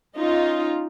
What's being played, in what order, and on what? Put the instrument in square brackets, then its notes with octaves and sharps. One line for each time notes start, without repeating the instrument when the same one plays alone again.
[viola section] C#4 D#4 F4